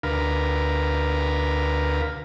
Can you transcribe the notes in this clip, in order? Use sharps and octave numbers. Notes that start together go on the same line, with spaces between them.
D2 A#4 B4 F5